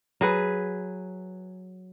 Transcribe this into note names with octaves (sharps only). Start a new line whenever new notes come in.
F#3 G#4 B4